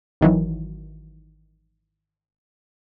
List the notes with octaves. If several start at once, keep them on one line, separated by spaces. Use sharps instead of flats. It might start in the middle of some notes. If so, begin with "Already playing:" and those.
G#1 D#3 E3 F#3